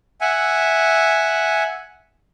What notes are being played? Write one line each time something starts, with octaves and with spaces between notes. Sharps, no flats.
E5 F#5 G#5